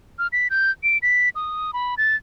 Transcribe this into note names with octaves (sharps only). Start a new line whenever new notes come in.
F6
B6
G6
D7
B6
D#6
B5
A6